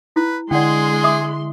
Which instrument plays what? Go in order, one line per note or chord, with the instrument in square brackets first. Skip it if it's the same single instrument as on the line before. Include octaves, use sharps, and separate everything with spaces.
[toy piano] E4 [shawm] B4
[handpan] D3 E4 [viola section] G#3 C6 [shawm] G#4 [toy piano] D5 F#5 G5
[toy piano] E5 D6 D#6